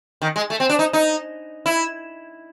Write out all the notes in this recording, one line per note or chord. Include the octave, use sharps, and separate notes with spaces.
D#3
G#3
A3
C4
D4
D#4
D#4
E4